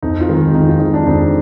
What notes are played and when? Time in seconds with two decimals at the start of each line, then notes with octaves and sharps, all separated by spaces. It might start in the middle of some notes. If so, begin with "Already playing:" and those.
0.03 F2 D#4
0.21 F4
0.28 D#3 G#3
0.55 F2 D#4
0.68 F4
0.80 D#3 G#3 D#4
0.94 D4
1.07 F2 D#4